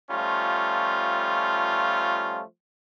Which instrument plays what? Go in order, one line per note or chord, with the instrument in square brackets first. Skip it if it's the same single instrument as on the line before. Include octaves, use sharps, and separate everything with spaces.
[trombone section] F3 G3 A3 C#4 F4